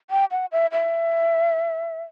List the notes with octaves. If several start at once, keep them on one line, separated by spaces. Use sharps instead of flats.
G5
F#5
E5
E5